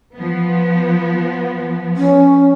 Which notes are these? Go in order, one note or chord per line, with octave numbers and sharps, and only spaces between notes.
F3 B3
C#4